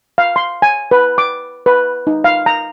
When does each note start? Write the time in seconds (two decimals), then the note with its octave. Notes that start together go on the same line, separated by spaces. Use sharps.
0.18 F5
0.36 C6
0.62 G#5
0.91 B4
1.18 D6
1.66 B4
2.07 D#4
2.24 F5
2.46 A#5